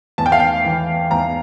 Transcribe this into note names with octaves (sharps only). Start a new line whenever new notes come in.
E2 A5
G5
F5
G5
E3
E2 A#5